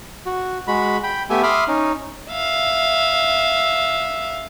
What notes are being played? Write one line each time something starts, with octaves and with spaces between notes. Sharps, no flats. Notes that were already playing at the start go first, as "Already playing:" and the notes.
F#4
G#3 F#4 B5
G5 B5
A3 B3 G4 E5 G#5
E5 B5 C6 D6 D#6 F6
C#4 D#4
E5 F5